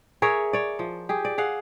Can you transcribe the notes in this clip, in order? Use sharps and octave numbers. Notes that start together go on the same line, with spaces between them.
G#4 A#4 C#5 E5
C#5 D5
F3
G4 G#4
D5
G#4 F5 F#5